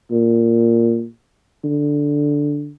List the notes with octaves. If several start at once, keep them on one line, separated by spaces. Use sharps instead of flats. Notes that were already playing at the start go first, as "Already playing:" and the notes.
A#2
D3